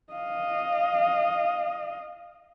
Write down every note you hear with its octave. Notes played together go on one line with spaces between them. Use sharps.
D#5 F5